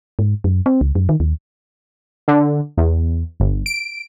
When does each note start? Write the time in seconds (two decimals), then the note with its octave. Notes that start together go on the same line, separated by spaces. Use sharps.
0.19 G#2
0.44 F#2
0.66 C4
0.81 C#2
0.95 F#2
1.09 D#3
1.20 D#2
2.28 D3
2.77 E2
3.40 G1
3.66 D7